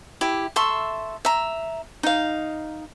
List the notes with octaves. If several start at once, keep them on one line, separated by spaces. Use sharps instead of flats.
E4 G4
A4 E5 C6 C#6
E5 A#5
D#4 F5